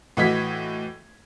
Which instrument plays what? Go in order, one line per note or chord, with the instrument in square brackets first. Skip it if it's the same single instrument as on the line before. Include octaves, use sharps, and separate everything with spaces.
[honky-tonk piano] A2 E3 F#4 D#5 G#6 B6